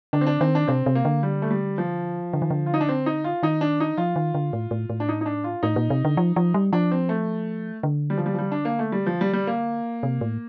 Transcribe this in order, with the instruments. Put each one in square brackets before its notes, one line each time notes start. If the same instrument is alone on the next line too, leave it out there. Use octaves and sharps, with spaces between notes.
[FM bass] D3 [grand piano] D4
[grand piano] C4
D4
[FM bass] D#3 [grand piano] C4
[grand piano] D4
[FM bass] C3 [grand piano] C4
[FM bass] C3
[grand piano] A#3
[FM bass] D3
[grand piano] G3
A3
G3
F3
[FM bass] D3
D#3
D3
[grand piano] F4
D#4
D4
C4
D#4
F4
[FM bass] D#3 [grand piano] D#4
[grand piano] D4
D#4
[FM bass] F3 [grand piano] F4
[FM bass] D#3
D3
A2
A2
A2
[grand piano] D4
D#4
D#4
D4
F4
[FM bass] A2 [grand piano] D#4
[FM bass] A#2
C3
D3
F3
F3
G3
[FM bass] F3 [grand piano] D4
[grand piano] C4
A3
[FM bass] D3
[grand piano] G3
F3
G3
F3
G3
D4
A#3
A3
G3
F3
G3
G3
A#3
[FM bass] C3
A2